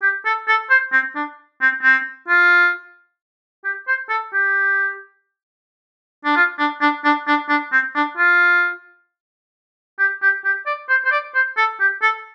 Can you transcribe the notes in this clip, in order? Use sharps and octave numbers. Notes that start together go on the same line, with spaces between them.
G4
A4
A4
C5
C4
D4
C4
C4
F4
G4
C5
A4
G4
D4
F4
D4
D4
D4
D4
D4
C4
D4
F4
G4
G4
G4
D5
C5
C5
D5
C5
A4
G4
A4